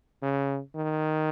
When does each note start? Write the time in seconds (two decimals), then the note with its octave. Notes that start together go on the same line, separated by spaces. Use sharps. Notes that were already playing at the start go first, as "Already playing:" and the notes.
0.22 C#3
0.75 D#3